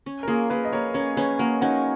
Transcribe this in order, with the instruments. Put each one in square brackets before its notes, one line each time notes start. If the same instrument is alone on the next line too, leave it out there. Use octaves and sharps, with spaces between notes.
[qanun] C#4
[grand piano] A#4
[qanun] A#3 [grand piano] F4 G#4
[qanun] A#3 [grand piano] G#4 B4
[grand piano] D#5
[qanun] A#3 [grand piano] A#4 C#5
[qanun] C#4 [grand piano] A#4 C#5
[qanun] C#4 [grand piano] G#4 B4
[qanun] A#3 [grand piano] F#4 A#4
[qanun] C#4 [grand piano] D#4 F#4